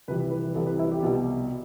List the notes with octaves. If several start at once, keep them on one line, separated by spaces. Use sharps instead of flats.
C2 C3 E3 B4
B4
B4
C2 C3 E3 A4
B4
E4
G4
C2 B2